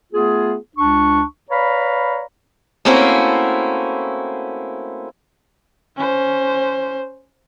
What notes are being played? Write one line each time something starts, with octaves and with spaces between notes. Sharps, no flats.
A3 B3 F4 G#4
C#2 D4 C#6
B4 C#5 D5 F5 A#5 B5
A3 A#3 C4 C#4 E4 F#4
C#4 C5